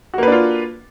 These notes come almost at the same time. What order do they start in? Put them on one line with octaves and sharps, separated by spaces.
F#4 A#3 B4 D4 F4